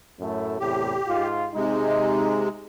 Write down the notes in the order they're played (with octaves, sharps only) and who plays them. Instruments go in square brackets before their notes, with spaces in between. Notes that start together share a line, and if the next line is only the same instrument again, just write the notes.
[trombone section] F#2 A2 A3
[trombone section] E2 A2 C3 [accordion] G4
[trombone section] G#2 F4
[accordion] C3 G#3 [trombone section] D#4